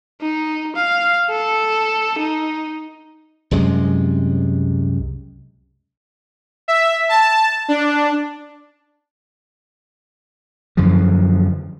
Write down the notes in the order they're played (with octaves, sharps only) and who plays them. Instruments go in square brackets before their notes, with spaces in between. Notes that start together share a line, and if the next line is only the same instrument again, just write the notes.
[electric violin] D#4
F5
A4
D#4
[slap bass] C2 F#2 C3 G#3
[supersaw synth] E5
A5
D4
[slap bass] F#2 D3 E3 F3